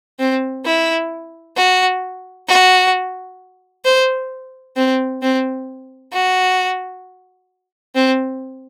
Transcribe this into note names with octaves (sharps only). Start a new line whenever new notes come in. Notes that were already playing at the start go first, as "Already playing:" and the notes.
C4
E4
F#4
F#4
C5
C4
C4
F#4
C4